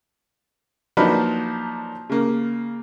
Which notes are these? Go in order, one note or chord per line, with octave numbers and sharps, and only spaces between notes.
F3 F#3 A#3 D4 D#4 B4
C#3 A#3